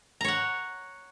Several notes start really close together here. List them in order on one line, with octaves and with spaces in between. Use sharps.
A#5 C#5 F#5